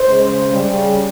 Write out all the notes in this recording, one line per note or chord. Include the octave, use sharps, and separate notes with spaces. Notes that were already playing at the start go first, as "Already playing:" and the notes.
Already playing: C5
C#3 G#3
C#3 G3